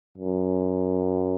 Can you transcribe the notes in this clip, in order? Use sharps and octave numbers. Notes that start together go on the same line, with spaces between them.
F#2